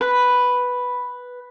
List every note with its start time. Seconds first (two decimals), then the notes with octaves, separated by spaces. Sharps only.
0.01 B4 B5